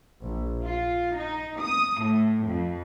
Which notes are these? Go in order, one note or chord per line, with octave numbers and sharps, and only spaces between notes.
A#1
F4
D#4
D#6
A2
F2